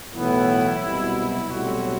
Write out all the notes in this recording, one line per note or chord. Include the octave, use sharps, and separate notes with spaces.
B1 A2 E3 B3 E4
C2 B2 F#3
E4
B1 A2 G3 C4 E4 F#4